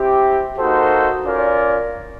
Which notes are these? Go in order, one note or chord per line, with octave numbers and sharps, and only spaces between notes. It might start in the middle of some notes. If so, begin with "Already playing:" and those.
Already playing: C4 E4 G4
A#3 D#4 F#4 A4 C5
C#4 F4 A#4 D5